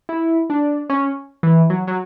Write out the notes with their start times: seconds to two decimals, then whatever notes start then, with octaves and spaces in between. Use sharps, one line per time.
0.09 E4
0.50 D4
0.90 C#4
1.43 E3
1.70 F#3
1.87 F#3